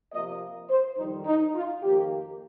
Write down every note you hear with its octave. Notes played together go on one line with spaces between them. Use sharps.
C3 F3 A#3 D#5
C5
F2 D#3 G3 D#4
D#4
F4
F2 D#3 A#3 G4